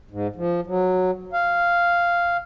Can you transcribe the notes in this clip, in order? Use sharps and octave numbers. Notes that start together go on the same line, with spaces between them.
G#2
F3
F#3
F5